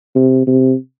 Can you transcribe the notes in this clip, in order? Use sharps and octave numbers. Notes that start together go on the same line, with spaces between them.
C3
C3